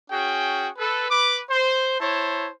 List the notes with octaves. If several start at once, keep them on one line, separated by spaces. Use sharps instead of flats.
C#4 F#4 G#4 G5
A4 B4
B4 D6
C5
E4 C5 C#5 A5